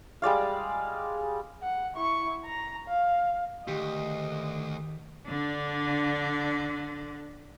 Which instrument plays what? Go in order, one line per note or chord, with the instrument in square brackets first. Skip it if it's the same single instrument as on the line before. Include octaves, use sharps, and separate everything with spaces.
[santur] G3 G#3 D5 F5
[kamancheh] F#5
E4 C#6
A#5
F5
[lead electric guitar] D2 [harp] D#3 G#3 [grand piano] G4 [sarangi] D#5
[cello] D3 D4